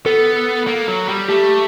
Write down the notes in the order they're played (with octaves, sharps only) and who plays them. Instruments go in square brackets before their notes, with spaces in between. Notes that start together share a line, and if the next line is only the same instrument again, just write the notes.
[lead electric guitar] B3 [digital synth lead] A4
[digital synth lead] A4
[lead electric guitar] A#3
F#3
G3
[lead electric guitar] A3 [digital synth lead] G4